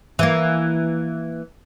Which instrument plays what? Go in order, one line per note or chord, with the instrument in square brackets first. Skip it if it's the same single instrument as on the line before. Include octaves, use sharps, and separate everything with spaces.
[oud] E3 A#3